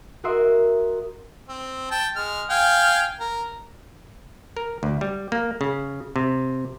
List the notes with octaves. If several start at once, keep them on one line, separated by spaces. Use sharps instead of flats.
F#4 A#4 D#5 E5 C6 D#6
C4
G5 A5
G#3 F6
F5 G5 G#5
A#4
A#4
D2
G3
A#3
C#3
C3